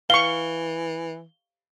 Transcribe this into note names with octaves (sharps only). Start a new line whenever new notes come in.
E3 F5 C#6 G7